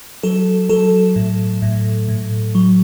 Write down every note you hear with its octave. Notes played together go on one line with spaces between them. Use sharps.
F#3 A4
F#3 A4
A2
A2
A2
F#3